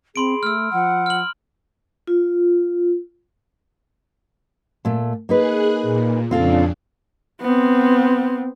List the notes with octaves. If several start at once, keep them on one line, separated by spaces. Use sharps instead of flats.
C4 G#4 B5 C6 D7
A3 E6 F6
F3 F#5
F6 F#7
F4
A#2 A3
A#3 D#4 G#4 B4 F#6
A#2
F2 C#3 C4 D4 F4 A4
B3 C4